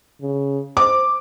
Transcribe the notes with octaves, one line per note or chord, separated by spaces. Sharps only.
C#3
C5 D6